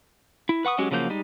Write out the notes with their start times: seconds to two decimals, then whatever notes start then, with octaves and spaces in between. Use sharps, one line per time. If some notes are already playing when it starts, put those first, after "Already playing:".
0.49 E4
0.65 B4 F#5 C#6 D#6
0.78 F#3 G#3 C#4 F#4 G4
0.91 C#3 F3 F#3 A#3 G6
1.10 G3 G#3 D#4